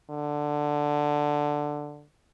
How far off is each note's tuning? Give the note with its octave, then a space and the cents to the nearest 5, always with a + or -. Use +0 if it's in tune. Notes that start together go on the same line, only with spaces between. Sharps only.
D3 +5